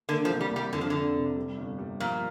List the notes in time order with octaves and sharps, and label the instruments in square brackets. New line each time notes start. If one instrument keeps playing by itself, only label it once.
[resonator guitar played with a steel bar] D3 [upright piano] A#3
[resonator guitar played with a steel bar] F3
[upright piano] C2
[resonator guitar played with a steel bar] G3
[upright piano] C2
[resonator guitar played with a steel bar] G3
[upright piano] F2 [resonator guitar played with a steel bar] D3
[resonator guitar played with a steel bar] F3
[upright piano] F2 [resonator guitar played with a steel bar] D3
[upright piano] C3
G3
G1
G3
[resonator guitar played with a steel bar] A#2 [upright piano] F3